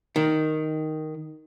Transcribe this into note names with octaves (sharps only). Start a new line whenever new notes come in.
D#3